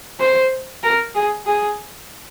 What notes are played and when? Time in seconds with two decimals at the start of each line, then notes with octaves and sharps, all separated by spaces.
0.20 C5
0.83 A#4
1.15 G#4
1.45 G#4